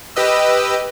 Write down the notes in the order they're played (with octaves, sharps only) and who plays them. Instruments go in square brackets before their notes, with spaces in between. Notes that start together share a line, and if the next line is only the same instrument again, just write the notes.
[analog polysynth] G4 B4 D#5 E6